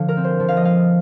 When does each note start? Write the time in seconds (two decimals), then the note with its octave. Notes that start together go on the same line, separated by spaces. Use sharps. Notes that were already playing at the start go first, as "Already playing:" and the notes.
Already playing: D3 F3 F5
0.08 A#4
0.17 C4
0.24 C5
0.40 F3
0.48 F5
0.57 D#5
0.64 G#3 F5